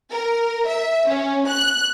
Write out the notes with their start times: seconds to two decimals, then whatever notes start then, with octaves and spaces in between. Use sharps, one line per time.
0.11 A#4
0.67 E5
1.08 C#4
1.47 F#6